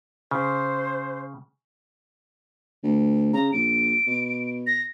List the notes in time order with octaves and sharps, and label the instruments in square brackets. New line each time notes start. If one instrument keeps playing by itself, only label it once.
[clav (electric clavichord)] C#3 [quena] C5
[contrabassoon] D2
[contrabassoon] C#3 [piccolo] A#5
[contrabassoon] A#1 [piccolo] D7
[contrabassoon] B2
[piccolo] A#6